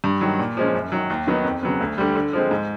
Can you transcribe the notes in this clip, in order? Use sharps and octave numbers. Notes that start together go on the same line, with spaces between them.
G2
D#3 F#3
A#2
F3 G#3 C#4
F#2
D#3 F#3
D#2
D#3 F#3 B3 D#4
F2
C#3 F#3 B3
D2
D3 G3
D3
F3 G#3 C4
G#2